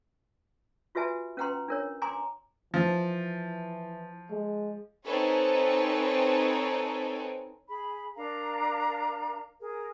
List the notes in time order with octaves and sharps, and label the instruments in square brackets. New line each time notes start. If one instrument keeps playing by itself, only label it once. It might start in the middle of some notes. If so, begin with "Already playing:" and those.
[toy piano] F4 F#4 B4 E5 G#5 A5
C#4 B4 F#5 G5 A#5 C6
D4 A#4 C#5
G5 G#5 A#5 C6 D6
[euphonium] E3 [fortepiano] F3
[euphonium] G#3
[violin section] C4 D#4 A4 B4 C#5 G#5
[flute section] G#4 B5
D4 A#4 F5 A#5
G#4 A#4